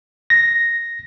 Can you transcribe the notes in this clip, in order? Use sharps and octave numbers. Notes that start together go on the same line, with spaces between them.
A#6